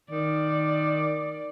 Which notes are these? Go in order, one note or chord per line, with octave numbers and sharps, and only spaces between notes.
D#3 D5